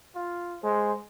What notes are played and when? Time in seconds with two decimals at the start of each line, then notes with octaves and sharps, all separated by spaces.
0.15 F4
0.63 G#3 C5